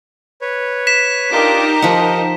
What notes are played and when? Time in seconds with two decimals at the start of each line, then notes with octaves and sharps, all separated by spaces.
0.41 B4 C#5
0.87 B6 E7
1.32 D4 D#4 F4 G4 A#4 D6
1.82 F3 D#5 F#5